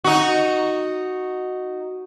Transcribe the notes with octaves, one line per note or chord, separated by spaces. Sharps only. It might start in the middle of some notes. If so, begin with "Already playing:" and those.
D#4 F#4